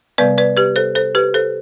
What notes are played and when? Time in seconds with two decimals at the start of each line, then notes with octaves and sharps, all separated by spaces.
0.18 C3 G3 B3 B4 D5
0.38 B4 D5
0.57 G4 B4
0.76 A4 C5
0.95 A4 C5
1.15 G4 B4
1.34 A4 C5